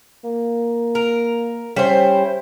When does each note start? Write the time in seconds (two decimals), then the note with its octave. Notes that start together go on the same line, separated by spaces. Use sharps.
0.24 A#3
0.95 A#4
1.76 G3 C#4 E4 C5